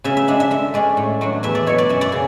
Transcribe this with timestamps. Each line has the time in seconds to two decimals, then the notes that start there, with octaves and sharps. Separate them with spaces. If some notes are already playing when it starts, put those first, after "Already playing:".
0.04 C#3 E5
0.17 E5
0.28 G#3 D4 E5
0.40 E5
0.51 D3 E5
0.74 G#3 C#4 D5
0.97 A2
1.21 F#3 A3 D4
1.43 E2 E5
1.55 D5
1.67 B2 F#3 C#5
1.78 D5
1.89 F#2 E5
2.01 D5
2.12 C#3